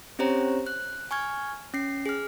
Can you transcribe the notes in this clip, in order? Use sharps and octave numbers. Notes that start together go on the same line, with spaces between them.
C4 C#4 G4 C5 C#5 A#5
F#6
G#5 C#6 F6 G#6
C#4 C7
G#4 F6